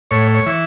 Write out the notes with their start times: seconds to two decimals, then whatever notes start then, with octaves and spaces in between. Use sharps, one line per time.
0.11 A2 C#5
0.35 C#5
0.46 E3